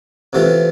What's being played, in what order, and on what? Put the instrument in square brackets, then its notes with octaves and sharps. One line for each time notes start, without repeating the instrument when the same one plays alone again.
[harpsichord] C3 E3 A3 C4 F4